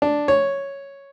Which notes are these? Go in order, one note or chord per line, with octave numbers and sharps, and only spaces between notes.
D4
C#5